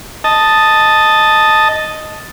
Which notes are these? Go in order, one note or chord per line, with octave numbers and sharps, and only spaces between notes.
D#5 A5